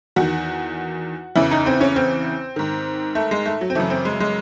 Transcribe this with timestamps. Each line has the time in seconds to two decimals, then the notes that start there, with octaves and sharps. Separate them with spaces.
0.16 E2 D#3 F#4
1.35 E2 C#3 E3 E4
1.51 D#4
1.66 C4
1.81 C#4
1.96 C4
2.56 G#2 D#3
3.15 A3
3.31 G#3
3.46 A3
3.61 F#3
3.70 C4
3.75 F#2 C#3 E3 A3
3.90 C4
4.05 G#3
4.20 G#3